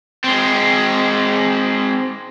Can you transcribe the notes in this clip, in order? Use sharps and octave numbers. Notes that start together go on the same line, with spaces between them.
G#3 C4